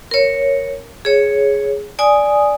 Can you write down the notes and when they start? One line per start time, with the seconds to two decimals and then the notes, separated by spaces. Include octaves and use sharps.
0.11 A#4 C#5
1.05 G#4 C#5
1.99 D5 G#5 D#6